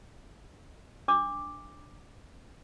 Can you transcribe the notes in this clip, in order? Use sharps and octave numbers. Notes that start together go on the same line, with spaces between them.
D4 D6